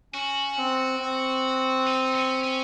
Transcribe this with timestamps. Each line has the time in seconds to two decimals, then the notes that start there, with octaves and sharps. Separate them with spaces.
0.13 C#4 F#4
0.58 C4
1.00 C4
1.87 D#4
2.15 C#4
2.43 C#4